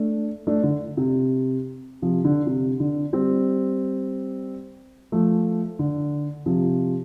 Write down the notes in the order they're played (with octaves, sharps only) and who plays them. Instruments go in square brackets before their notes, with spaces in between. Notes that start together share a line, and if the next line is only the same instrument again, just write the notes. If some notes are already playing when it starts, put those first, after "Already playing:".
Already playing: [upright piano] A3 D4
A3 D4
D3
C3
C3 F3
D3
C3
D3
G3 C4
F3 A3
D3
C3 F3